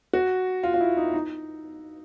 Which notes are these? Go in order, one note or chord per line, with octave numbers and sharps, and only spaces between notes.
F#4
F4
F4
E4
D#4
D#4